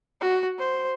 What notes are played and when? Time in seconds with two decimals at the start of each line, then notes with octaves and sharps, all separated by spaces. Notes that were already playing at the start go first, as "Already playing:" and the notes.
0.21 F#4
0.58 C5